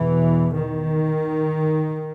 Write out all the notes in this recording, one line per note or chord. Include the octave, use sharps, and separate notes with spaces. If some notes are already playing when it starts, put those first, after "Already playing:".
Already playing: E2 B2 E3
D#3